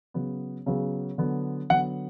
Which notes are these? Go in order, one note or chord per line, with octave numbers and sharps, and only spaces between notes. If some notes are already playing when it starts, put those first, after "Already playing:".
C#3 F#3 B3
C#3 F#3 B3
D3 F#3 B3
D3 F#3 B3 F#5